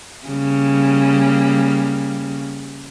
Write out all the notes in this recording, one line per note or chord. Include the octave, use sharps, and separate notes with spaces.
C#3 G3 A#3